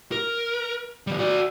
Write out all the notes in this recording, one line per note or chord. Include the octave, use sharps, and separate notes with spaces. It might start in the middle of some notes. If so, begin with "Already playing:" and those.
A#4
D#3 G3
F#4 D5